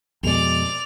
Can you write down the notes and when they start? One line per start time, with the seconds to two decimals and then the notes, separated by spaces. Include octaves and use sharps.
0.23 F2 B2 G#3 D5 F7